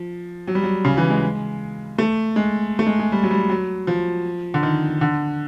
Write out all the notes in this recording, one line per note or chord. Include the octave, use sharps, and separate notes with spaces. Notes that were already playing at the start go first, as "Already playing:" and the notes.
Already playing: F3
F#3
G3
F#3
C#3
E3
G#3
A3
G#3
A3
G#3
G#3
G3
F#3
G3
F#3
F3
D3
D#3
D3